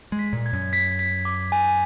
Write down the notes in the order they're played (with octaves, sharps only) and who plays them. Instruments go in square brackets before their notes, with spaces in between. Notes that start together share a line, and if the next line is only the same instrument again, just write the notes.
[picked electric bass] G#3
[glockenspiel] B6
[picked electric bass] A#2
[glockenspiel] G#6
[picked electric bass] F#2
[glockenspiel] B6
B6
D6
G#5